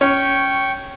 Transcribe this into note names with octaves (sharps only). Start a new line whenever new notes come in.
C#4 G5 C#6